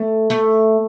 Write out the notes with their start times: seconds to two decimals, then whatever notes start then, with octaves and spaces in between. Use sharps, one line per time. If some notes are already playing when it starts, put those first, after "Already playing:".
Already playing: A3
0.30 A3